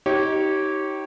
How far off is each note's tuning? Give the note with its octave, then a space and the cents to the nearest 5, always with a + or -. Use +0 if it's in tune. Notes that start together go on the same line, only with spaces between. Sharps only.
D#4 +25 G4 -25 C#5 -20